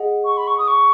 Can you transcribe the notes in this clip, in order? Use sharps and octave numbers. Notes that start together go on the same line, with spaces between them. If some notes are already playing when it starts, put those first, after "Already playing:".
Already playing: G#4 D#5 F#5
C#6
B5
C#6
D#6
C#6